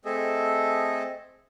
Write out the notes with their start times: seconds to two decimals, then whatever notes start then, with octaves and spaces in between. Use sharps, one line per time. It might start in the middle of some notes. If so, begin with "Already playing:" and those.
0.05 A3 C4 G#4 A4 D#5 E5